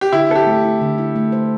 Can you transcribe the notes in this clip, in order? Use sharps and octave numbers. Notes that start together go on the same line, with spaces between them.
G4
D3 E4
C4 A4
G4
A3
E4
D3
E4
A3
C5